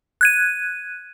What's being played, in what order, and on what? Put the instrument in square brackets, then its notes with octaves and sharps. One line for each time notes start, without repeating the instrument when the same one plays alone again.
[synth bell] F#6 G#6 D#7